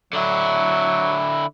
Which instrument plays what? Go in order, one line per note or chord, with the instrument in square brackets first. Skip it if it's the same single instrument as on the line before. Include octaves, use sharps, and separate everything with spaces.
[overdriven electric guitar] D3 E4 [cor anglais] F#3